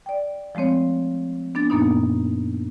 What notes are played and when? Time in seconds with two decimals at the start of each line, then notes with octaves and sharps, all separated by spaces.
0.06 D5 G5
0.55 F3 G#3 A3 C4 C#5
1.55 B3 D4 A6
1.70 F#2 A#2 A#3 B3 D4 D#4